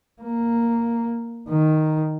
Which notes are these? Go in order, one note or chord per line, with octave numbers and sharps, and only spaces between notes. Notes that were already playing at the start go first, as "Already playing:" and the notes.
A#3
D#3